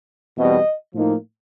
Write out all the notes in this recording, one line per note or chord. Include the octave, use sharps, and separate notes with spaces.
E2 B2 G3 C4 D#5
A2 F3 A#3 D#4